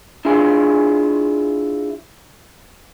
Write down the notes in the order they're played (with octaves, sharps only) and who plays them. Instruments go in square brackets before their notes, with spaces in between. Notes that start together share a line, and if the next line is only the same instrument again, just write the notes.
[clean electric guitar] D4 E4 F4 G#4